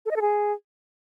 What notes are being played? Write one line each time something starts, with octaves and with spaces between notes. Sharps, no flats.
A4
D#5
A4
G#4